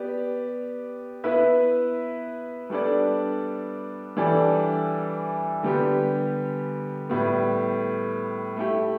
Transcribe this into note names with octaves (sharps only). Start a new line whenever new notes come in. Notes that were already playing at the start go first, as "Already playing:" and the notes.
Already playing: B3 G4 D5
B3 E4 B4 E5
G3 B3 D4 A4 D5
E3 G3 D4 A4 D5
D3 G3 B3 G4
A2 G3 B3
A3 E4 G4